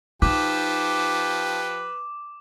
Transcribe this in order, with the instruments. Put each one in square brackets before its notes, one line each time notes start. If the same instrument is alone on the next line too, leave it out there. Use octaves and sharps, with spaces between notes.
[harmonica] F3 G4 [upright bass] D#4 [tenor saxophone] B4 [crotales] D6